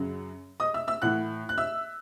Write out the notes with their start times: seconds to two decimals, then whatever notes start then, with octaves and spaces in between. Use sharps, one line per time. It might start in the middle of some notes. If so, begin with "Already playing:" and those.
Already playing: F#2 C#3 F#3
0.60 D#5 D#6
0.74 E5 E6
0.87 E5 E6
1.02 A2 E3 F#5 F#6
1.49 F#6
1.58 E5 E6